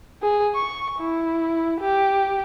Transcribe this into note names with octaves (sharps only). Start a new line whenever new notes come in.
G#4
C#6
E4
G4